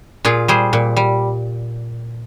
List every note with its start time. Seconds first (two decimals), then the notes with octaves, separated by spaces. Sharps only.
0.25 A#2 F4 G#4
0.48 G3 G#4 C5
0.73 A#2
0.97 G3